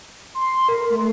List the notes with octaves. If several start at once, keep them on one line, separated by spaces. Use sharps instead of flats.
C6
A#4
A3